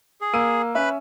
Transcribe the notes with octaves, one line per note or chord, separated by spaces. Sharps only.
G#4
A#3 E6 D#7
C#4 B4 E5 B5